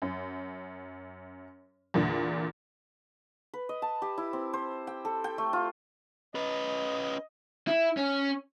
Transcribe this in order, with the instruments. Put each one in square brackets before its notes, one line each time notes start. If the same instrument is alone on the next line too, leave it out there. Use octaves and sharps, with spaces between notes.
[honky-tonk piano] F#2
E2 A#2 D3
[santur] B4
D#5
A5
G4
E4
C4
C5
G5
A4
G5
A3
F4
[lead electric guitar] C#4 B4 [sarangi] D#5
[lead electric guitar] E4
C#4